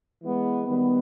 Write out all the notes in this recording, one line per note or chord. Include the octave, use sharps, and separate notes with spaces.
E3 G#3 B3
D#3 G3 B3